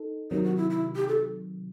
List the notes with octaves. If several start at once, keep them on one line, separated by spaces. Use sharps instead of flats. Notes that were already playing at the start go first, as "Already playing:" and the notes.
Already playing: D#4 A4
C3 D#3 F#3 D#4
F#4
E4
E4
G4
A4